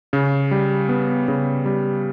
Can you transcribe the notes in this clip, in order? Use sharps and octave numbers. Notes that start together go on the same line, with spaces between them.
C#3
G3
B3
C#3
G3